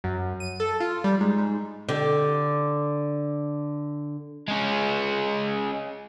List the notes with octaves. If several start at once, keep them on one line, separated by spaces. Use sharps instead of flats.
F#2
D#7
A4
F4
G3
G#2
G#2
D3 G4
G#3 C#4